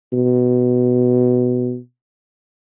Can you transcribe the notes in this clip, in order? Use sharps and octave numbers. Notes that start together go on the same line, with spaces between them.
B2